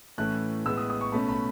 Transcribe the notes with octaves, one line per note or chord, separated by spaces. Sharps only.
A2 E3 A3 C#4 F#6
A2 G#3 B3 E6
D#6
D#6
C#6
B2 A3 C#4 B5
B5